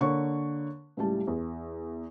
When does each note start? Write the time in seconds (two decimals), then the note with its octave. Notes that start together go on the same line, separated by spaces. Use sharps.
0.01 D3 A#3 C#5 C#6
0.97 C#2 A2 G3 A5
1.27 E2